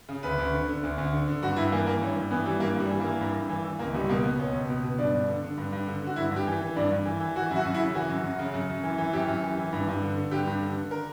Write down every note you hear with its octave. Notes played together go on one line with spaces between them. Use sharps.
C#3
D2 B4
D2
D3
D3
D2
D2
D3
D3
G2 F#4
G2 E4
E3 A#3
E3 A#3
G2 C#4
G2
E3 B3
E3 G3
G2 A#3
G2 G3
E3
A#3
E3
G2
G2
E3
E3
C#2 A#3
C#2 G3
G3
B2 A#3
B2 B3
C#2 C#4
C#2
B2
B2
G2 D4
G2
D3
D3
G2
G2
D3
D3 F#4
G2 E4
G2
G4
E3
E3
G2 D4
G2
E3
E3
E3 F#4
F#2 E4
F#4
F#2
E4
C#3
E3 F#4
F#2
F#2
C#3
F#2
F#2
E3
E3
F#2 G4
F#2
E3
E3
G2
G2
D3
D3
G2 G4
G2
D3
D3
A#4